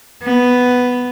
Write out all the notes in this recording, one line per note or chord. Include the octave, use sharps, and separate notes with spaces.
B3